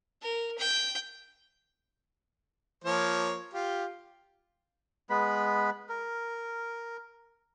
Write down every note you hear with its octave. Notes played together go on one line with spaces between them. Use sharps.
A#4
G5
F3 A#3 C#5
F4 G4
G#3 B3 B4 B5
A#4